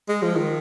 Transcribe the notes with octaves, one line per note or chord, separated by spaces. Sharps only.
G#3
F3
D#3